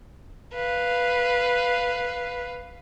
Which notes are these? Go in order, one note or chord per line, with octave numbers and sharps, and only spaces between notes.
B4 F5